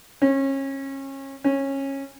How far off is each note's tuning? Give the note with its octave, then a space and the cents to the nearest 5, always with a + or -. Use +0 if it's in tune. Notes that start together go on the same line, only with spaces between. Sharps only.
C#4 -30
C#4 -20